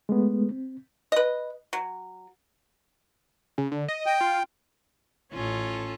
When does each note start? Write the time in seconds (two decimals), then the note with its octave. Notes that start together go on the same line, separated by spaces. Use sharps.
0.09 G#3 A3 B3
0.51 C4
1.12 B4 D#5
1.73 F#3
3.58 C#3
3.72 D3
3.88 D#5
4.06 G5
4.21 F4
5.32 A1 C#4 F4 A4